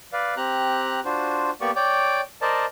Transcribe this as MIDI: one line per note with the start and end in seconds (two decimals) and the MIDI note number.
0.13 0.35 71
0.13 0.35 74
0.13 0.35 77
0.37 1.00 60
0.37 1.00 67
0.37 1.00 82
0.37 1.00 90
1.05 1.51 62
1.05 1.51 65
1.05 1.51 66
1.05 1.51 72
1.61 1.71 58
1.61 1.71 59
1.61 1.71 67
1.61 1.71 74
1.61 1.71 85
1.76 2.21 73
1.76 2.21 74
1.76 2.21 79
1.76 2.21 86
2.42 2.66 70
2.42 2.66 72
2.42 2.66 74
2.42 2.66 75
2.42 2.66 81